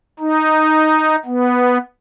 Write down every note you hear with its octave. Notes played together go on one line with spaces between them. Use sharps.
D#4
B3